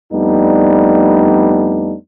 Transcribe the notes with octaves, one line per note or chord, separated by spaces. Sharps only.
F2 G3 A3 B3 D4 D#4